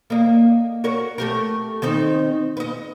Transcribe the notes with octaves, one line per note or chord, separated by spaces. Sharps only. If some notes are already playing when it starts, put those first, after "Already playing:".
A#3 D#5
F#4 A#4 C#5
A3 G4 A#4
D#3 C4 D#4
B4 D#5